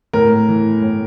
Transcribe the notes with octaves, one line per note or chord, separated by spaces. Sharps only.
A2 A#4
E3
A2